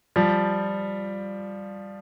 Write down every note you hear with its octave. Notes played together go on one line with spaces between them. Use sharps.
F3 G3